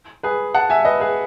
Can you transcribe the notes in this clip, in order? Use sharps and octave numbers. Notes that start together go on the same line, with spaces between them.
G#4 B4
F#5 A5
E5 G#5
B4 D#5
G#4 B4